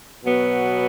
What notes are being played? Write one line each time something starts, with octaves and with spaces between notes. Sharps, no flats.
B2 F#3 B3